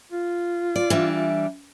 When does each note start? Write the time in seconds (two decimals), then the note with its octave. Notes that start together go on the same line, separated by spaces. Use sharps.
0.12 F4
0.76 D5
0.90 E3 G3 D4